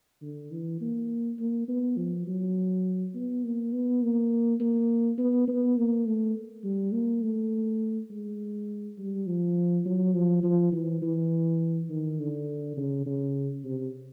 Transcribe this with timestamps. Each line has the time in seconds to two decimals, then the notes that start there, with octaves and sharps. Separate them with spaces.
0.22 D3
0.51 E3
0.81 A#3
1.39 A#3
1.68 B3
1.97 F3
2.27 F#3
3.15 B3
3.44 A#3
3.73 B3
4.02 A#3
4.60 A#3
5.18 B3
5.48 B3
5.77 A#3
6.07 A3
6.64 G3
6.93 A#3
7.22 A3
8.11 G#3
8.98 G3
9.27 F3
9.86 F#3
10.14 F3
10.44 F3
10.72 E3
11.02 E3
11.90 D#3
12.19 D3
12.77 C#3
13.06 C#3
13.64 C3